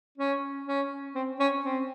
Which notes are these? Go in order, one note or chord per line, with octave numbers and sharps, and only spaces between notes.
C#4
C#4
C4
C#4
C4